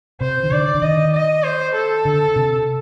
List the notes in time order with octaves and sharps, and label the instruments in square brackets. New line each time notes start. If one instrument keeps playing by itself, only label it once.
[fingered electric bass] C3 [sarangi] C5
[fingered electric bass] D#3
[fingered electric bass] D3 [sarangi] D5
[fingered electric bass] D3
[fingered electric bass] D#3 [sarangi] D#5
[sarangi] D#5
C5
A4
[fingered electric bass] D3
C3